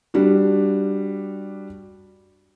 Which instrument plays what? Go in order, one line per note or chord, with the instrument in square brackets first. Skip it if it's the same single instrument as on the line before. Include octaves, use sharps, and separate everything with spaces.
[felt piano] G3 D4 F#4